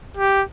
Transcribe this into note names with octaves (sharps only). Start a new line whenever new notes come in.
G4